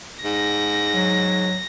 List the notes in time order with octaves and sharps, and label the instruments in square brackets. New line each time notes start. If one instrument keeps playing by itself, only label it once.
[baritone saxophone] G#2 [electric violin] A#6
[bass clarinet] F#3